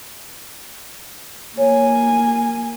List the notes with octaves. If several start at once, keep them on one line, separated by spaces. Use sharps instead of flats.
A#3 C#5 G#5